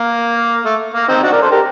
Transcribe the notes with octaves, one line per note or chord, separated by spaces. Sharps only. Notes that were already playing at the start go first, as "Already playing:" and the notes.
Already playing: A#3
A3
A#3
C4 D#4
D4 F#4
A#4 D5
A4 C5
G4 A#4